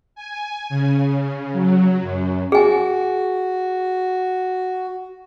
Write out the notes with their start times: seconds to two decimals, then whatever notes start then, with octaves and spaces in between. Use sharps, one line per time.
0.15 G#5
0.69 C#3
1.53 F#3
2.02 F#2
2.52 F#4 G#4 G#5